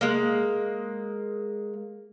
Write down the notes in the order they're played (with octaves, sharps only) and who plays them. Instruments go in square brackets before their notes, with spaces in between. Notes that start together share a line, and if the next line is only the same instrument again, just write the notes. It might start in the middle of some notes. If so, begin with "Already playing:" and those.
[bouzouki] G#3 A#3